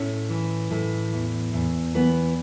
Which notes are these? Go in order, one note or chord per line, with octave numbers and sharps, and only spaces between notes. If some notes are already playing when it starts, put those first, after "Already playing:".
Already playing: A2 C#4
E3
A2
E2
E2
E3 B3